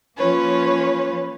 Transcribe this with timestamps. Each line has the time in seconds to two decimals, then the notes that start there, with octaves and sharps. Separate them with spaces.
0.17 F3 A#3 C#4 F4 B4 C#5